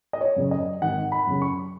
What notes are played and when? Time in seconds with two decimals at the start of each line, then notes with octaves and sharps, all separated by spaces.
0.13 D#5
0.21 C#5
0.36 F#2 C#3
0.51 D#5
0.82 G#1 F#5
1.12 B5
1.27 F#2 C#3
1.42 C#6